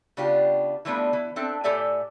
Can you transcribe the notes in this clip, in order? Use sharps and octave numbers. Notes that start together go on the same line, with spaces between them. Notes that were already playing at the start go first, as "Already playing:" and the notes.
C#3 B3 D4 F4 G4
E3 F3 G3 A3 B3 D4
E3
C4 D4 A4 E5
A2 G4 A4 D5 E5 G#5